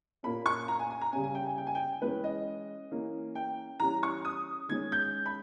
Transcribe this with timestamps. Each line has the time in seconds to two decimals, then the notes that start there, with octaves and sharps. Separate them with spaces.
0.23 A#2 A#3 C#4 B5
0.46 C#6
0.68 A#5
0.79 G#5
0.90 G#5
1.01 A#5
1.12 C#3 G3 C#4 G#5
1.24 G#5
1.35 G5
1.46 G#5
1.58 G5
1.67 G#5
1.75 G5
2.01 E3 G#3 C#4 B4
2.24 D#5
2.91 E3 A#3 C#4
3.35 G5
3.80 E3 G3 C#4 A#5
4.03 C#6
4.25 D#6
4.69 D#3 G#3 C#4 G#6
4.92 G6
5.26 B5